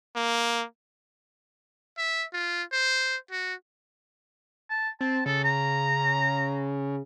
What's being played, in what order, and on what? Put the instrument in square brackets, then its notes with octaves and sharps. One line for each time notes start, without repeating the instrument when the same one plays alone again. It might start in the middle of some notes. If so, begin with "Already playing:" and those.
[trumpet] A#3
[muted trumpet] E5
F4
C5
F#4
[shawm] A5
[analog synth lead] C4 [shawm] A5
[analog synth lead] C#3 [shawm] A4
[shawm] A#5